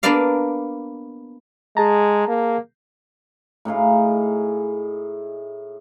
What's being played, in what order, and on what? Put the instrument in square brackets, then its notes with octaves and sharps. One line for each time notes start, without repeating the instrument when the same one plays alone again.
[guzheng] A#3 B3 D4 A#4 D5 F5
[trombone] G#3 [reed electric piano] G#4 A5 A#5
[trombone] A#3
[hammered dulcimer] A2 D#4 G#4 F5